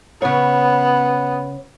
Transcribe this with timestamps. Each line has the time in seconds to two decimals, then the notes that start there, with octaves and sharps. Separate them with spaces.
0.22 C#3 B3 C#5